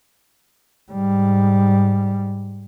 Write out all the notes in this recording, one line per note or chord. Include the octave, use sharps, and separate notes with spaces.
G#2 G3